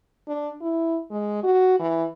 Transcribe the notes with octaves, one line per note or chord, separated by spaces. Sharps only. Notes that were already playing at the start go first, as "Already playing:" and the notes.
D4
E4
G#3
F#4
E3